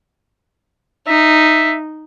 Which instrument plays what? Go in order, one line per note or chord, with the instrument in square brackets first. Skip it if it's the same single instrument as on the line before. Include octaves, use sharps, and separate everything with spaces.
[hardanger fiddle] D#4 [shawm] E5